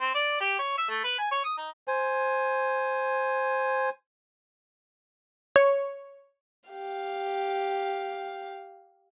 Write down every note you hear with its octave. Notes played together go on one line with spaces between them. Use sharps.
C4
D5
G4
C#5
E5
A3
B4
G#5
C#5
D#6
D#4
C5 G#5
C#5
G4 F5